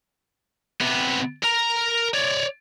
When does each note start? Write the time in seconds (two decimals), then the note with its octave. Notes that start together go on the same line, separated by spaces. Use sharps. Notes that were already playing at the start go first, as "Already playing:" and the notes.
0.81 C3 B3
1.43 A#4 A#5
2.14 C#5 D5